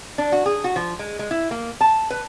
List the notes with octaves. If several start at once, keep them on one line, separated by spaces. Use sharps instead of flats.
D4
F#4
G#4
F#4
F3
G#3
G#3
E4
A#3
A5
B4